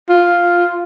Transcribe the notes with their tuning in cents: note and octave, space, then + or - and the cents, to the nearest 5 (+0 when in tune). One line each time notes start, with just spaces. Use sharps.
F4 +0